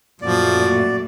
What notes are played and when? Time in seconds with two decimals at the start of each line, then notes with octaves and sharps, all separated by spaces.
0.22 F#2 A#2 F3 A3 F#4 D5